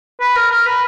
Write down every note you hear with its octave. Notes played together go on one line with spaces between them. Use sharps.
B4
A#4
A#4
B4